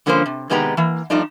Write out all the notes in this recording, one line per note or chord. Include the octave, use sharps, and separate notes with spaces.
G2 D3 F3 A#3 C#4 C5
C3
C3 D#3 G#3 B3 G4 A#5
E3 A#3
G2 F3 A3 D4 D#4